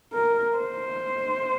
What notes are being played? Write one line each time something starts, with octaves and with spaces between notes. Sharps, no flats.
A#4
C5